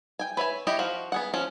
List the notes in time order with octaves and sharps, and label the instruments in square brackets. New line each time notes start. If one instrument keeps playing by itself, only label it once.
[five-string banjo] G5 G#5
B4 C#5 E5 G#5
E4 F#4 G4 C#5 D#5
F3 F#4 F5
B3 G#4 F#5
F3 C#4 F4